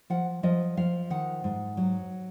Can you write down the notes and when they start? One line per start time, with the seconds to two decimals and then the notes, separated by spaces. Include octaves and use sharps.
0.10 F3 F#5
0.43 F3 D#5
0.77 F3 F5
1.10 D#3 F#5
1.44 G#2
1.77 F#3